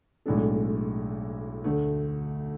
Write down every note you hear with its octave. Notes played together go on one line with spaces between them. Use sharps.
B1 A2 G#3 D4 A4
D2 D3 A3